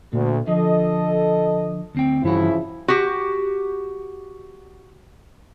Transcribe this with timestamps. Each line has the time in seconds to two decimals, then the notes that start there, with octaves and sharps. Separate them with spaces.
0.13 D2 A#2
0.47 D3 F3 A4 D#5
1.95 D2 C4 G5
2.23 G2 C#3 E3 F3 E4 F#4
2.88 F#4 G4